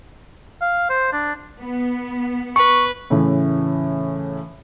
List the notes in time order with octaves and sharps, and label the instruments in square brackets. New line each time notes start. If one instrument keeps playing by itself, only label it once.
[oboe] F5
C5
D4
[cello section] B3
[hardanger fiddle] B4 [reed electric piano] C#6
[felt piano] A2 C#3 E3 A3